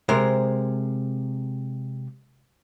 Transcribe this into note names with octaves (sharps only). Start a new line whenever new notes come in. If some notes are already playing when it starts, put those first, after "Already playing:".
C3 G#3 A#4 C5